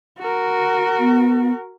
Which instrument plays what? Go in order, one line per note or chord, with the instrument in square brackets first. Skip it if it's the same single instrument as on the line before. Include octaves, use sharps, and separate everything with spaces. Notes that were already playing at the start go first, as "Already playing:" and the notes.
[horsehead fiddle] F#4 A#4
[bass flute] B3